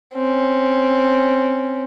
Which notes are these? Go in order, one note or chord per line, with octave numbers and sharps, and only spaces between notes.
C4 C#4